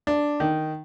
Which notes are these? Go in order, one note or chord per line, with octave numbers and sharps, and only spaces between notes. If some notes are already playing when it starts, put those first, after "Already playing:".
D4
D#3